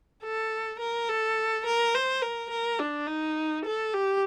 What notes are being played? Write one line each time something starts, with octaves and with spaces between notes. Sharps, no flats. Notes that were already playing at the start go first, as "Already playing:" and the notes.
A4
A#4
A4
A#4
C5
A#4
A#4
D4
D#4
A4
G4